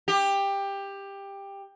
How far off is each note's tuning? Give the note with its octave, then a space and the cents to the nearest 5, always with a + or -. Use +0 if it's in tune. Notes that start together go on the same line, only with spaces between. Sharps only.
G4 +15